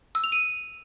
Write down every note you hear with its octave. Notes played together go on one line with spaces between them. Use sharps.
E6
F7
D#7